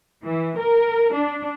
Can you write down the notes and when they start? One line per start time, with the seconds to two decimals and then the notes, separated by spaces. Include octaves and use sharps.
0.24 E3
0.60 A#4
1.15 D4